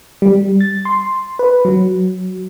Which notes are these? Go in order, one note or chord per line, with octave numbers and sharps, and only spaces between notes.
G3
A6
C6
B4
F#3